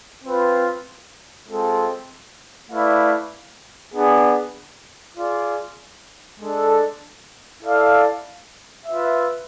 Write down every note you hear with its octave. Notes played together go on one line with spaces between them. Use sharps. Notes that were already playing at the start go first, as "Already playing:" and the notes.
C4 F4 B4
G#3 C4 F4 A4
A3 E4 B4 D5 F5
B3 D4 G#4
F4 G#4 D5
G#3 D4 A4
E4 A4 D5 F5
F4 B4 E5